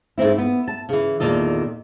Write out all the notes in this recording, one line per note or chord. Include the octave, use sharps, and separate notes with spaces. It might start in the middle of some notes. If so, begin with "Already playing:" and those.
G#2 A3 C4 E4
B3
A5
C#3 E3
E2 A#2 D#3 A4 D#5